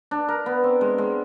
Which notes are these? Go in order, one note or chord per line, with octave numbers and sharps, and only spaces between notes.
D4
A#4
B3
C4
G#3
G#3